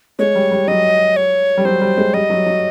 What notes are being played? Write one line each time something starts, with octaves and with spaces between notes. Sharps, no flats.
G#3 C#5
G3
G3
F#3 D#5
C#5
G3
F#3 C5
G3
G#3
G3 D#5
F#3
F#3